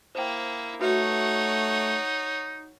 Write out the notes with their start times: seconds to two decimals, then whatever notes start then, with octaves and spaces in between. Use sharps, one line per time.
0.15 A#3 E4 C5 G5
0.81 A3 D#4 F#4 B4 C#5 E5 F#5